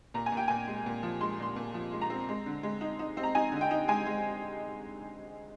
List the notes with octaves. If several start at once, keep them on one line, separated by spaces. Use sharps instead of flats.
A#2 A#5
G#5
A#2
G5
A#2 G#5
G#3
A#2
F3
G#3 C6
A#2 C6
A#2
F3
G#3
A#5
C4
G#3
D3
G#3
D#4
D#4
C4
A#5
D#4 G#5
D3
G5
D#4
G#3 G#5
G#3